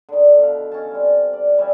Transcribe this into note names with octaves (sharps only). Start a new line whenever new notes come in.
D3 D#3
B2 F5
C#4 A5
G3 C4
D5
G3 C#4 E5